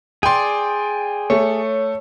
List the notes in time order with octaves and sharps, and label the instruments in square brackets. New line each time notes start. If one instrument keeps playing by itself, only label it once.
[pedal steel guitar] G#4 D5 [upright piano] G5 C6
[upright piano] A3 [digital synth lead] C#5